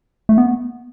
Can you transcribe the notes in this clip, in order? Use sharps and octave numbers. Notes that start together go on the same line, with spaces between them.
A3
B3